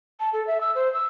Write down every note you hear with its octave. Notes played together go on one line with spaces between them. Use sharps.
A5
A4
E5
E6
C5
E6